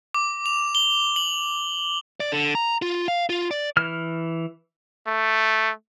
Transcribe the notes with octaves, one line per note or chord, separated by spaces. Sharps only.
D6
F7
G7
F#7
D5
D3
A#5
F4
F5
F4
D5
E3 F6
A3